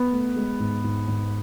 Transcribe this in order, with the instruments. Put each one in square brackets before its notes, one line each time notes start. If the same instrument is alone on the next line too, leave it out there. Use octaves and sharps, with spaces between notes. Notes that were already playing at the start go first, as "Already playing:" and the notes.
Already playing: [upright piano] B3
[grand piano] A3
G#3
G#2
G#2
G#2